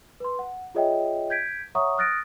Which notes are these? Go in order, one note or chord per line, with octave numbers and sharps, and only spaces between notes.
B4 C6
F#5
F4 G#4 C#5 D#5 E5 G5
G6 G#6 B6 D7
C#5 E5 F#5 A#5 C#6 D#6
D#6 F6 F#6 A6 A#6 D7